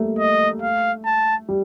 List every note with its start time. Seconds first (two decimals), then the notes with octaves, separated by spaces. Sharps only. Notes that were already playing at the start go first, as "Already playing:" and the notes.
Already playing: G3 A3 A#3
0.19 D#5
0.62 F5
1.05 A5
1.49 G3